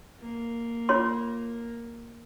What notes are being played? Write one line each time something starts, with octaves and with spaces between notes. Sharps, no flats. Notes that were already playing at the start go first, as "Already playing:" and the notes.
A#3
F4 C#5 C6